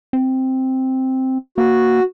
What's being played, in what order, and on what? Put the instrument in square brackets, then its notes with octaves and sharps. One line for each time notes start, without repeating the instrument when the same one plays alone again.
[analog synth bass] C4
[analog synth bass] A#3 [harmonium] F#4